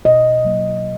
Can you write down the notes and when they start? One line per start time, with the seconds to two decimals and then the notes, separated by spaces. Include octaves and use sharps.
0.05 B2 D#5
0.45 F#3 A#3